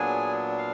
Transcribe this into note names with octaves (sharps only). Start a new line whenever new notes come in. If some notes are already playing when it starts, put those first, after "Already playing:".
Already playing: A#2 F#3 B3 D4 G#4 G#5
F5